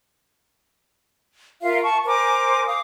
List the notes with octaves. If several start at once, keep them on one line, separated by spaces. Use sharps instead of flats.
F4 A#4 E5 F5
A5 C#6
A#4 C5 G#5 D6
F5 D6 D#6